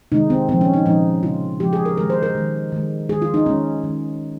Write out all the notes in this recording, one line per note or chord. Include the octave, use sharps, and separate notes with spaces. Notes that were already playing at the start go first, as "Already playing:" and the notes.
C3 D#3 G#3 D#4
C4
A#2 F3 G#3 C4
C#4
D#4
A#2 F3 G#3 D#4
C#3 F3 G#3 F4
C#3 F3 G#3 G4
G#4
A#4
D#3 G#3 A#4
C5
A#4
D#3 G#3
D#3 G#3
D#3 G#3 G#4
F4
D#4
D#3 G#3 C#4
D#3 G#3